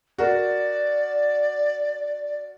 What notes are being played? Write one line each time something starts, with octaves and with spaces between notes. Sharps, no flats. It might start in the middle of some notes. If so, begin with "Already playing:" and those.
F#4 A#4 D5